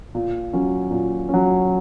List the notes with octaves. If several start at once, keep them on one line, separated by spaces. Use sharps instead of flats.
A#2
F#3 C#4
A#2
F#3 C#4